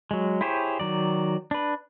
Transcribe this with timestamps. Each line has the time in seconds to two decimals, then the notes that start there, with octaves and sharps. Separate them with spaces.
0.11 F#3 G#3
0.41 E4 G4 G#4 C5 C#5
0.80 D#3 F#3 D5
1.51 D4 B4